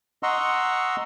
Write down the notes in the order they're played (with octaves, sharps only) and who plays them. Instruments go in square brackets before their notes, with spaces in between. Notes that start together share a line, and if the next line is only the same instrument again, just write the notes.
[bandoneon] D#5 F#5 A#5 C6 C#6 E6